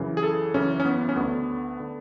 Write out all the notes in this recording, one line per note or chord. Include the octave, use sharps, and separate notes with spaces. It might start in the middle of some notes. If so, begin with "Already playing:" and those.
Already playing: F#2 C#3 E3
G#4
A4
F#2 C#3 E3 C#4
C#4
B3
C#4
D2 D3 B3
D3